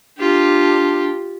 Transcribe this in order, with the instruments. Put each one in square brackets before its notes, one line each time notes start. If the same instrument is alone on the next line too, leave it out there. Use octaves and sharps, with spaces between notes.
[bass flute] D4 [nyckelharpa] F4 G4